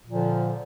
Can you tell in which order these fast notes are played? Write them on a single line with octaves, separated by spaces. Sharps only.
A#2 F3 D3